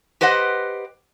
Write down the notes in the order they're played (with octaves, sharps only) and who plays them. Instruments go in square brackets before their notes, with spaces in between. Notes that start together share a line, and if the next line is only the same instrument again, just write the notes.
[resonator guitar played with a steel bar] G4 B4 C5 D#5 F#5